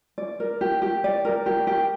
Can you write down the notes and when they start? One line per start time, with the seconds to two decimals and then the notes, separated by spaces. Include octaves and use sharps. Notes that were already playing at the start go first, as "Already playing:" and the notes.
0.18 D5
0.40 A#4
0.61 G4
0.82 G4
1.04 D5
1.25 A#4
1.46 G4
1.67 G4